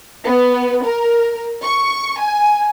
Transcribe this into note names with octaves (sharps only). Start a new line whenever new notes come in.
B3
A#4
C#6
G#5